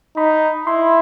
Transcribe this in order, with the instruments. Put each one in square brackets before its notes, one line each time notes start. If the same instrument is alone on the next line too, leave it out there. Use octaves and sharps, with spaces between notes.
[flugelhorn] D#4 [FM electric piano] B5
[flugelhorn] E4 [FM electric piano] C6